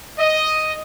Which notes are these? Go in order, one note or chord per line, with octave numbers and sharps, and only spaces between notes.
D#5